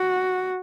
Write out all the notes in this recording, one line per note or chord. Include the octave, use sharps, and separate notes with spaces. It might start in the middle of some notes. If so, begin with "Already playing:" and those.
Already playing: F#4